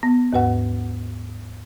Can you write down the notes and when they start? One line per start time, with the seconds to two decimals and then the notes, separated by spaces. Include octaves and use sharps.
0.03 B3
0.33 D#2 G#2 B4 F#5